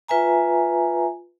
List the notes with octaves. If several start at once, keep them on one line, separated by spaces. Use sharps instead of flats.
F4 B4 E5 G#5 A#5